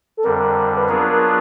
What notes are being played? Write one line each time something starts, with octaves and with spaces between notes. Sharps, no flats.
A4
F2 D3 G3 A#4
B4
F#3 B3 D4 F4 G#4 A#4
A#4